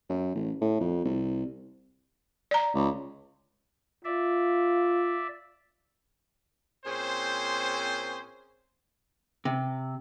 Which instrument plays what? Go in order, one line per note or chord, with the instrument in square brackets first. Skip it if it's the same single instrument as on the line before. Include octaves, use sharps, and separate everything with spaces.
[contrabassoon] F#2
A1
A2
F2
C2
[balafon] D5 A#5
[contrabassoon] C#2
[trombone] F4 [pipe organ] D5 E5
[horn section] A#2 C4 C#4 G#4 C5
[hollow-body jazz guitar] C3